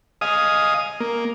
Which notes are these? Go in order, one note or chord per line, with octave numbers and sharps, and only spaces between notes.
D#5 F5 G#5 D#6
A#3